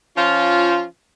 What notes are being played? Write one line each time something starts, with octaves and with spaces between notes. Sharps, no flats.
F3 C#4 F4